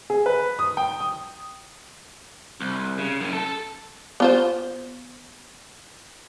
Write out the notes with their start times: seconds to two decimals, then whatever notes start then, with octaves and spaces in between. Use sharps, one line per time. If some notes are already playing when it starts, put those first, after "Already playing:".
0.10 G#4
0.26 B4
0.59 D#6
0.77 G5
1.00 D#6
2.60 C2
2.98 C#3
3.21 F#2 C#3
3.33 A4 A5
4.20 B3 F4 C5